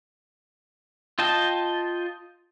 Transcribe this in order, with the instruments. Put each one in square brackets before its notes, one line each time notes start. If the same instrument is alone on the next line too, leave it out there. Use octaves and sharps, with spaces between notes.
[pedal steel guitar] F4 D#5 G5 A5